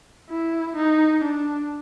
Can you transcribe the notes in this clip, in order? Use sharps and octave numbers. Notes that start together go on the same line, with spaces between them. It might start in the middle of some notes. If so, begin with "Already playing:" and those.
E4
D#4
D4